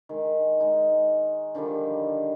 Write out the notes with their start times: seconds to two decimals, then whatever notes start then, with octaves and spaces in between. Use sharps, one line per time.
0.09 D#3 G#3
0.60 G#3 D#4
1.55 D3 D#3 F3 G3